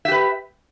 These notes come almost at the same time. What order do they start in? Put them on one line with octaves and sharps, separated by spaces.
E5 G4 B4